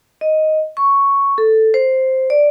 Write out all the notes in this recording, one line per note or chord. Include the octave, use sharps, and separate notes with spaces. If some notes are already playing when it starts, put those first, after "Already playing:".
D#5
C#6
A4
C5
D5